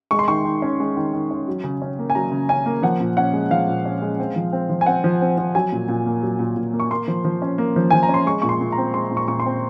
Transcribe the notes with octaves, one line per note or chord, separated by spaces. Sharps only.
G#3 C#6
C6
D#3 C#6
D#3
C#4
G#3
D#3
D#3
C#4
F#3
C#3
C#4
A#3
G#5
F#3 A#5
C#3
C#4 G#5
A#3
F3 F#5
A#2
C#4 F#5
G#3
F3 F5
A#2
C#4
G#3
C4
F3
C4
F3
G#5
C4 F#5
F3
C4
F3
F#3 G#5
A#2
A#2
A#3
F#3
A#2
A#2
A#3
C#6
A#3 C6
F3
F3
C#4
A#3
F3
F3 G#5
A#5
C#4
C6
G#3 C#6
A#2 C#6
C6
A#2
A#5
C4
G#3 C6
A#2
C#6
A#2 C#6
C6
C4